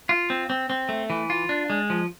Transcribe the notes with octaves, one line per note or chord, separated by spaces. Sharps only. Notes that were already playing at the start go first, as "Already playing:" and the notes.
F4
C4
C4
C4
A3
E3
F4
D4
G#3
F3